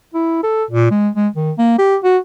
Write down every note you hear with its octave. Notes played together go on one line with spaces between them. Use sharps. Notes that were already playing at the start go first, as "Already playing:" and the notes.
E4
A4
A#2
G#3
G#3
D#3
A#3
G4
F#4